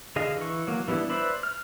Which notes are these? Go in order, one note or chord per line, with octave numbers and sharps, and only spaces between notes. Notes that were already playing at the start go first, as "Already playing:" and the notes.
D3 G#4 D#5 F5
E3 C#6
F#3 A#3
E3 G3 B3 D4 E4
B4 C5 D5 E5 B5
F6